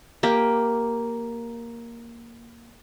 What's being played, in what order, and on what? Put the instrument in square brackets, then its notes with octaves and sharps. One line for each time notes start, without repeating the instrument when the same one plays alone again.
[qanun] A#3 G4